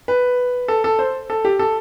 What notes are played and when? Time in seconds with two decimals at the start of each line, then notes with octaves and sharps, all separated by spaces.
0.08 B4
0.68 A4
0.84 A4
0.99 C5
1.30 A4
1.45 G4
1.59 A4